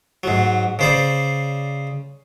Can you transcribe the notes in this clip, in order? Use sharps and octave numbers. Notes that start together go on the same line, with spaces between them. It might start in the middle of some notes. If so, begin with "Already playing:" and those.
G#2 F#3
C#3 C5 D5